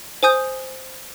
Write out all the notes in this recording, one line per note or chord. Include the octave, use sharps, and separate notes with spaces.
C5 G#5 D#6 G6